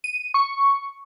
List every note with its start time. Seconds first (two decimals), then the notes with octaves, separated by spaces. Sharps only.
0.04 D#7
0.34 C#6